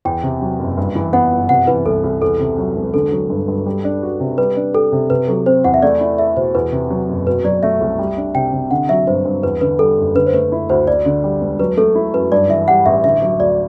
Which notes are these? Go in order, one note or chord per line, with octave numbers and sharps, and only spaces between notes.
E2 G5
C3
F#3
F#1
G2
E3
B3 F#5
G1
C3 F#5
E3 B4
C2 A4
C2
E2 A4
C3
F#3
E1
D3 A4
F#3
G2
G2
G3
D4
F#4
C3
G3 B4
D4
G4 A4
C3
C3 B4
F#3 A4
C4 C5
E2 F#5
E5
A3 D5
E4
A4 E5
B2 C5
E2 B4
C3
F#3
F#1
B2 B4
F#3 D5
A3 E5
C2
G3
D4
C3 G5
C3
D3 F#5
F#3 E5
G2 C5
G2
E2 B4
D3 B4
G3 A4
F#1
D3 B4
C5
A3 B4
E4
D2 C5
D2 D5
D3
G3
E1
F#3 B4
A3 A4
E4
F#2 B4
G2 D5
E3 E5
G3 F#5
A1 E5
D3 E5
F#3
D2 D5